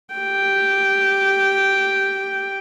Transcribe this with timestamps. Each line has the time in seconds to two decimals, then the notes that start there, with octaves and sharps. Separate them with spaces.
0.14 G4 G5